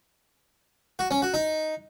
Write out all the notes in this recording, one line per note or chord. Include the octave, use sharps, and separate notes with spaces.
F#4
C#4
F#4
D#4